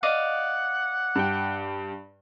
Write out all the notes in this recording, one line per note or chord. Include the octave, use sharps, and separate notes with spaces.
D5 D#5 F5 F#5
G2 G5